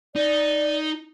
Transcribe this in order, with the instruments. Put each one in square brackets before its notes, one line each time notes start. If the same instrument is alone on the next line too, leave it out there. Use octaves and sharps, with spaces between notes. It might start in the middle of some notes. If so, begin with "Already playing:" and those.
[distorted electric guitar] D#4 [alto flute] D5